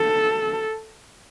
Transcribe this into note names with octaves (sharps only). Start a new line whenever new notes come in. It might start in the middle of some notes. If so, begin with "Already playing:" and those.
Already playing: A4